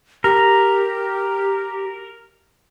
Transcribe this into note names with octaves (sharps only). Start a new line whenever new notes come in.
G4 A#4